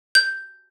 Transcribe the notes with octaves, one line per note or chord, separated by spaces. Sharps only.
G6